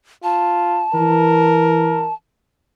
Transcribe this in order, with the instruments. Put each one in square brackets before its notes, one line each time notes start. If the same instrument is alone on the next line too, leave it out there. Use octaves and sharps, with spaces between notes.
[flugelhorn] F4 [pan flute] A5
[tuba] E3 [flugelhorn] A#4